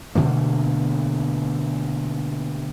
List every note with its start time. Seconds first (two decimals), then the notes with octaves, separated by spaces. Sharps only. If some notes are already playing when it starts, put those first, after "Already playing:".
0.15 B2 D3 A3 A#3